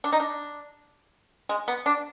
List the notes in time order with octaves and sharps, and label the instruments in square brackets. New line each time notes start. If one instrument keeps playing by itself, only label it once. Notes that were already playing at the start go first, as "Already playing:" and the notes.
[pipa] D4
D#4
D4
G#3
B3
D4